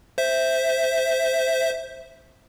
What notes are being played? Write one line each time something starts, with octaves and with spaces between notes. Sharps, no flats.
C5 E5